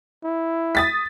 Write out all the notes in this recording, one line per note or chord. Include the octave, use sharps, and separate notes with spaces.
E4
D#6 A6 B6